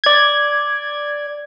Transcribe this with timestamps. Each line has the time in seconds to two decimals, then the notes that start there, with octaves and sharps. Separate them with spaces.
0.04 D5 G#6